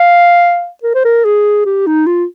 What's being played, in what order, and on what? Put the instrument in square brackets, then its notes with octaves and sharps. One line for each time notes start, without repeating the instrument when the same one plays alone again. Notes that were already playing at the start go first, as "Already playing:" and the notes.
Already playing: [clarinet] F5
A#4
C5
A#4
G#4
G4
D#4
F4